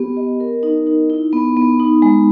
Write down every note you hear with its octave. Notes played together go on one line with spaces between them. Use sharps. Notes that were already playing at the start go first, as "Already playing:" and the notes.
Already playing: B3 G4
D#5
A#4
D#4
D#4
E4
B3
B3
D#4
G#3